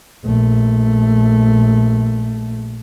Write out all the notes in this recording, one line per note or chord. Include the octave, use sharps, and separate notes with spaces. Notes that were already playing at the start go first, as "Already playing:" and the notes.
A#1 A3